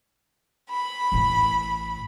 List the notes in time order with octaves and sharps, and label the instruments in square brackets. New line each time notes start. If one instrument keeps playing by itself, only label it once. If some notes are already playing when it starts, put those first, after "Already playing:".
[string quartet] B5
[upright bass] A1 A2